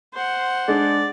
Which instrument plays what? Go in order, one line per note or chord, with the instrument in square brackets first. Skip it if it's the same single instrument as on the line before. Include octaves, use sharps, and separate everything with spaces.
[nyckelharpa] C5 F#5
[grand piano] G#3 D4 [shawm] D5